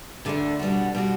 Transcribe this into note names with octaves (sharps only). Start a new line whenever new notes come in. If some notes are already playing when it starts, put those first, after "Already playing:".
D2 D3 A3 D4
B2 G3 D4 F#4
B2 G3 D4 F#4